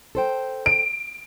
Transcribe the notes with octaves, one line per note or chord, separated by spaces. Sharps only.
A4 C5 G5
D7